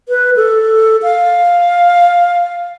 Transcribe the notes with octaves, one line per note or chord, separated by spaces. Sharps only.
B4
A4
F5